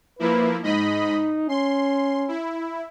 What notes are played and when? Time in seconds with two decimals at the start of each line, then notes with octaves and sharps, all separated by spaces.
0.19 F3 A#3 E4 B4
0.62 G#2 D#4 D#5 B5
1.49 C#4 C6
2.28 E4